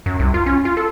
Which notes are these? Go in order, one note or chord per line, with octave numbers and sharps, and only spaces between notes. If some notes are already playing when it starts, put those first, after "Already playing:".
F#2
C2
F4
C#4
F4
A4